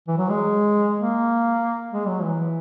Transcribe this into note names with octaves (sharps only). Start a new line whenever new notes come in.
E3
F#3
G#3
A#3
G#3
F#3
E3